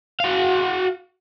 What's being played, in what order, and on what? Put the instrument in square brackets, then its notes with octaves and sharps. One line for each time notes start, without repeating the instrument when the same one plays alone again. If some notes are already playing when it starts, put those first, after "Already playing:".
[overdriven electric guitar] F#4 F5